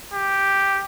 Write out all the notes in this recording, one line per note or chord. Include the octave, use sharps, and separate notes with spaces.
G4